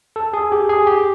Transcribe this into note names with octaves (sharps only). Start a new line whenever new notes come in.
A4
G#4
G4
G#4
G4